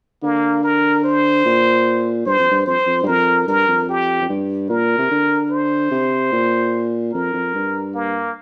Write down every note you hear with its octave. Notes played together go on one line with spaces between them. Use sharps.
D3 A#3
A#4
C5
A#2
G2 C5
F2
G2
F2 C5
F2
G2
F2 A#4
G2 A#4
F2
G4
F2
G2
A#2 A#4
C3
D3
C5
C3
A#2
F2 A#4
F2
G2
A#3